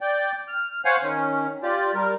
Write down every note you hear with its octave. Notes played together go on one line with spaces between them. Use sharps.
D5 G5
F6
C5 C#5 F5 F#5 G#5
D#3 C#4
F4 G4 D5
G3 A#4